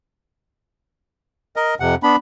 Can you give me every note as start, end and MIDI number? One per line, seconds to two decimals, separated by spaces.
1.56 1.75 70
1.56 1.75 75
1.80 1.95 41
1.80 1.95 48
1.80 1.95 78
2.03 2.16 59
2.03 2.16 62
2.03 2.16 83